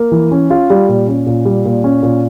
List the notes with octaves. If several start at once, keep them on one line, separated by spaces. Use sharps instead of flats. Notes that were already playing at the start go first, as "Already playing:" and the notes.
Already playing: A#3
E3
C#4
F4
G3
A#2
C#4
A#2
G3
A#2
C#4
A#2